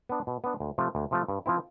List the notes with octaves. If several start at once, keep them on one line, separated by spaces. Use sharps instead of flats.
B3 D4
B2
B3 D4
D2
C3 F3 A3
D2
C3 F3 A3
G2
F3 C4 E4